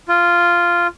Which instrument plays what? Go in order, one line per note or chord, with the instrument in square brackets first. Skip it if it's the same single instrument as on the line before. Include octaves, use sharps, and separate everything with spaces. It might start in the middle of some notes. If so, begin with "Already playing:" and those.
[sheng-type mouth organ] F4